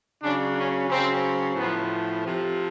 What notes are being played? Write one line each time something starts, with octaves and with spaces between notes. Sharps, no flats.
C#3 F#3 D4
C#4
C#3 F#3 C4
A2 F3 B3
C3 F3